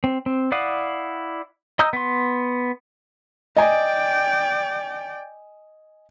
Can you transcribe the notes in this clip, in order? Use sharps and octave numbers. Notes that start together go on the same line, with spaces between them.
C4
C4
E4 D5 F5 F#5 D#6
D#5 A#5 D#6 E6 G6
B3 C6
D5 D#5 G5 G#5